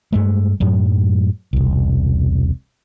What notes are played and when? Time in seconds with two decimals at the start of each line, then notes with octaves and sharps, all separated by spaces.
0.12 G2 G#3 A3
0.60 F#2 A2 F#3
1.53 E1 C2